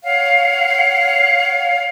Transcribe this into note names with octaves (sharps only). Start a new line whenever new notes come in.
C#5 F5 F#5